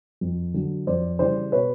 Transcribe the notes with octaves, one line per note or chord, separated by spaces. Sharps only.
F2
D3 F#3
F2 C5 D5
C#3 E3 G3 C5 D5
B2 B4 C#5